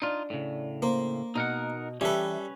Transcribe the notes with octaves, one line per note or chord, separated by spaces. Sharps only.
D4 D#4 F4
A2 C#3
A#3 C5
B2 D#4 A#4 F#5
E3 G3 C#4 G4 A4 B4 E5